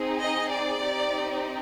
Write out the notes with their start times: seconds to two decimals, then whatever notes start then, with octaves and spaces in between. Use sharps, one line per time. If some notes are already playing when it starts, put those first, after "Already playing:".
Already playing: C4 D#4 G#4
0.22 D#5
0.52 D5
0.82 C4 D#4 G4